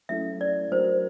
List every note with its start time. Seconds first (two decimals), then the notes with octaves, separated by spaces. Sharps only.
0.09 F#3 A3 C#4 E4 A4 E5
0.41 D5
0.71 F#3 A3 D4 F#4 A#4 C5